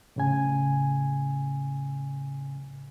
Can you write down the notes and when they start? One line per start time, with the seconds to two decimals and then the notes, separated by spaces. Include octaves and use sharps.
0.16 A2 C#3 G#5